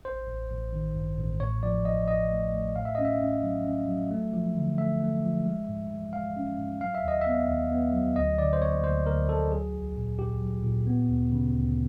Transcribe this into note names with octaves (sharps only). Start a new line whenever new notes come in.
A1 C5
A1
A1
D#3
G2
A1
A2 C#5
F3 D5
A1 D#5
F3 D#5
A3
A3
A2 F5
E5
C#4 D#5
E5
C#4
F#3
C#4
F#3
A3
F3
D3
A3 E5
A3
F3
G#3
G#2
E3
G#3 F5
C#4
G#2
F#3 F5
E5
D#2 D#5
B3 E5
D#2
B3
F#3
D2 D#5
D3 D5
C5
A#3 C#5
D2 C5
D2 A#4
D2 A4
F#3 G#4
B1
A#2
A#2 G4
F#3
A#2
B3
D2
C#3
D2